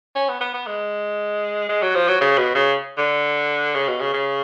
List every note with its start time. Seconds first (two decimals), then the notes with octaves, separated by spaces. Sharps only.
0.16 C#4
0.29 B3
0.41 B3
0.54 B3
0.67 G#3
1.69 G#3
1.82 F#3
1.95 F3
2.08 F#3
2.21 C#3
2.38 B2
2.55 C#3
2.98 D3
3.75 C#3
3.88 B2
4.00 C#3
4.14 C#3